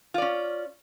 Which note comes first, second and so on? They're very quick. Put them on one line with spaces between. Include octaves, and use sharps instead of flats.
F4 D5 C#4